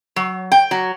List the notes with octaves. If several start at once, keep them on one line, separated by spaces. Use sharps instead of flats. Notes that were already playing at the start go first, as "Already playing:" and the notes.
F#3
G5
F#3